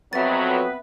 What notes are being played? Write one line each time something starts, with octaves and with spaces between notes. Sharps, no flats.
F2 F#3 B3 C4 B4 E5 A6